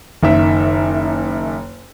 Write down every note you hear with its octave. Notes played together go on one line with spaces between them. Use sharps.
F#1 D#3 E5